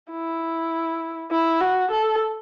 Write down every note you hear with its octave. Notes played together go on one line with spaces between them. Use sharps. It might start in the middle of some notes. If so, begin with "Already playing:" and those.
E4
E4
F#4
A4